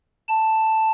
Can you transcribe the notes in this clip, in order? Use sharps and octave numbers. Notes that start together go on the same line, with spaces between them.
A5